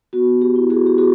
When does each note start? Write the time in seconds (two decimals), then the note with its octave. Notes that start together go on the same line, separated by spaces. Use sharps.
0.13 B3 F#4
0.42 G4
0.56 E4
0.70 F#4 G#4
0.87 G4
0.98 B3 F#4 G#4